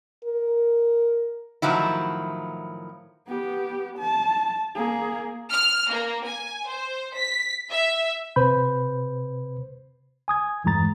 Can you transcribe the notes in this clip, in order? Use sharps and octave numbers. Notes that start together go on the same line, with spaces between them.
A#4
A2 D#3 F3 F#3 E4
B3 G4
A5
A#3 G#4
F6
A#3
G#5
C5
B6
E5
C3 B4 C5 B5 G6
G#5 D#6 G#6
E2 G2 E3 G#3 A#5 A6